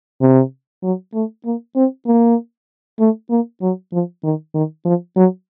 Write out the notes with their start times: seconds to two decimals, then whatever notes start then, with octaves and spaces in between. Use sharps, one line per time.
0.21 C3
0.83 F#3
1.14 A3
1.45 A#3
1.76 C4
2.07 A#3
2.99 A3
3.30 A#3
3.61 F#3
3.92 F3
4.23 D#3
4.54 D#3
4.85 F3
5.16 F#3